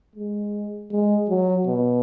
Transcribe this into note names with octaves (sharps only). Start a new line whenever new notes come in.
G#3
G#3
F#3
B2